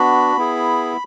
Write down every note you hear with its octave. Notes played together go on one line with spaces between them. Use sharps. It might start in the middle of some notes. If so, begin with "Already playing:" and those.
Already playing: B3 D4 F#4 B5
B3 E4 G#4